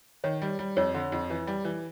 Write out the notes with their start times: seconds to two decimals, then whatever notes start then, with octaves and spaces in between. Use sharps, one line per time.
0.24 D#3 C#5
0.42 G3
0.59 G3
0.77 F2 C#5
0.94 D3
1.12 F2
1.30 E3
1.47 G3
1.65 E3